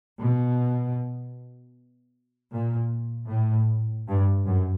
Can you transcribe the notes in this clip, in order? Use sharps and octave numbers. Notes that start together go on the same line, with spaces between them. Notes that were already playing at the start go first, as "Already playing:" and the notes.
B2
A#2
A2
G2
F#2